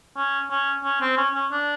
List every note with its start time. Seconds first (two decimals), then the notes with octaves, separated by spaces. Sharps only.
0.17 C#4
0.50 C#4
0.84 C#4
1.01 C4
1.17 C#4
1.35 C#4
1.52 D4